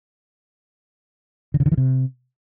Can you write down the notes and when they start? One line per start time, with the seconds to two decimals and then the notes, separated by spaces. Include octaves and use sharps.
1.54 D3
1.60 C#3
1.66 D3
1.72 E3
1.77 C3